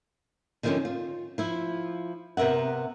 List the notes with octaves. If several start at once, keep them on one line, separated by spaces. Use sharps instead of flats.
D3 D#3 F3 G#3 C4 C#4
F4
F3 E4
C3 B3 A#4 E5 F#5